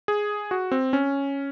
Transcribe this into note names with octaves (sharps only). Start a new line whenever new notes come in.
G#4
F#4
C4
C#4